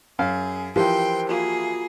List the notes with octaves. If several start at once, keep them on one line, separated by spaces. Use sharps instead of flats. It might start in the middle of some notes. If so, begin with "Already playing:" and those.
F#2 G#4 F5
E3 F3 G4 A#4 C5 G5 C6
A#3 F4 F#4 G#4